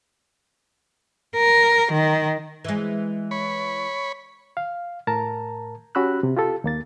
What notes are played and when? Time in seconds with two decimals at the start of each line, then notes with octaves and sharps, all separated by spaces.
1.36 A#4
1.93 D#3
2.64 E3 G#3
3.31 C#5 B5
4.57 F5
5.07 A2 A#4 A5 A#5
5.95 C#4 F#4 G4 B5 E6 F#6
6.23 C3
6.37 F4 G4 A4
6.64 D#2 A#3 A6